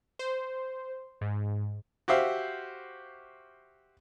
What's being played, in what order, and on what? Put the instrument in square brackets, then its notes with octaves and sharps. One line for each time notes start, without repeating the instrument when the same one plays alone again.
[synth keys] C5
G#2
[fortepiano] F#4 G4 C5 E5 F5